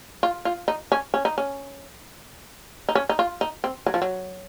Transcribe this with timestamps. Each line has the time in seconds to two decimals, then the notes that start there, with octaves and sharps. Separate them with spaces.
0.23 F4
0.45 F4
0.68 D#4
0.92 C#4
1.14 C#4
1.25 D#4
1.38 C#4
2.89 D#4
2.95 C#4
3.09 D#4
3.19 F4
3.41 D#4
3.64 C4
3.86 F#3
3.94 F3
4.02 F#3